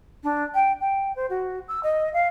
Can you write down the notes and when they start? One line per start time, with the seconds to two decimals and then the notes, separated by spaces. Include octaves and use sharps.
0.23 D4
0.54 G5
0.80 G5
1.15 C5
1.29 F#4
1.68 E6
1.83 D#5
2.13 F5